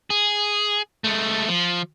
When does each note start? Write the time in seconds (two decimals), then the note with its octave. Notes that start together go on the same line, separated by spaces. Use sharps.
0.10 G#4
1.04 G#3 A3
1.48 F3